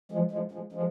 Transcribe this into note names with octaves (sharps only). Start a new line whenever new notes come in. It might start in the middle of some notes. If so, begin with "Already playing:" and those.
F3 G#3
F3 G#3
F3 G#3
F3 G#3